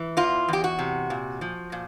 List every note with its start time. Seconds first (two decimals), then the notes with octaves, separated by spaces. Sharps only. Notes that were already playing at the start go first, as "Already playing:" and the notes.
Already playing: E3
0.17 E2 F4
0.48 E2 G4
0.64 F#4
0.79 C3
1.10 A#2
1.41 F3
1.72 A#2